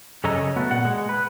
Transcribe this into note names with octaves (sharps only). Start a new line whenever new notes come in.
F#2 C#3 A4 C#5 D#5 A#5
A3 B3 F#4
A#2 F#5
G#3
B4